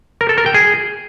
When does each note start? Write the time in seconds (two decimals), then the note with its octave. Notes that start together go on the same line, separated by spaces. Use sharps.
0.21 A#4
0.29 A4
0.38 A#4
0.46 G5
0.54 G#4